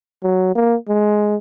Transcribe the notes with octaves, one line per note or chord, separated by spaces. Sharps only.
F#3
A#3
G#3